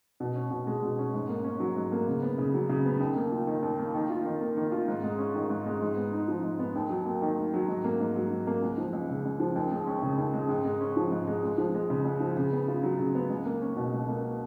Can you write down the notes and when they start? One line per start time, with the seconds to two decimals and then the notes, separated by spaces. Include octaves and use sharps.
0.20 B2
0.36 C#4
0.51 B2
0.67 G#3
0.83 B2
0.99 C#4
1.14 G#2
1.29 A#3
1.44 C#4
1.60 F#3
1.76 G#2
1.92 A#3
2.08 C#3
2.23 B3
2.38 C#3
2.54 F#3
2.69 C#3
2.86 B3
3.00 D#2
3.16 A#3
3.32 F4
3.47 D#3
3.63 D#2
3.79 A#3
3.95 D#3
4.10 F4
4.25 D#3
4.41 A#3
4.57 D#3
4.72 F4
4.88 G#2
5.04 G#3
5.19 C#4
5.35 D#3
5.50 G#2
5.66 G#3
5.82 G#2
5.97 B3
6.13 D#4
6.28 F3
6.44 G#2
6.59 B3
6.76 D#2
6.90 F#3
7.06 A#3
7.22 D#3
7.38 D#2
7.54 F#3
7.68 G#2
7.84 A#3
8.00 G#2
8.16 F#3
8.31 G#2
8.47 A#3
8.62 C#2
8.78 F3
8.93 C#2
9.10 C#3
9.25 C#2
9.40 F3
9.56 D#2
9.71 G#3
9.87 C#4
10.02 C#3
10.18 D#2
10.34 G#3
10.49 G#2
10.65 G#3
10.81 C#4
10.96 F3
11.12 G#2
11.27 G#3
11.43 C#2
11.58 F3
11.75 G#3
11.90 C#3
12.05 C#2
12.20 F3
12.37 C#3
12.52 B3
12.68 F4
12.83 F#3
12.99 C#3
13.15 B3
13.30 C#2
13.46 A#3
13.62 C#4
13.76 B2
13.92 C#2
14.08 A#3